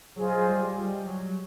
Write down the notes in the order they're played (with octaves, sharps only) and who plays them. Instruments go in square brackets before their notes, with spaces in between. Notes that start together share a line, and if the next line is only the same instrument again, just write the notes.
[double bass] F#3 [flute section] F4 G#4 C5 D#5
[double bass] G3
G3
F#3